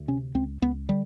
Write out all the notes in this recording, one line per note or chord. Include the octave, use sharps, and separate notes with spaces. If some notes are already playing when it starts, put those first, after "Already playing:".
Already playing: D2
C3 C#4
C#2 C4
C#2 B3
D3 G3